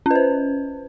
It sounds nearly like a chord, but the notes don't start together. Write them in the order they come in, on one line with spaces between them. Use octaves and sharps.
C#4 B4 C5